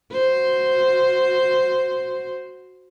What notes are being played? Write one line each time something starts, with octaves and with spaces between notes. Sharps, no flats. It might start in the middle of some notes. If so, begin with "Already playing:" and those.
F#4 C5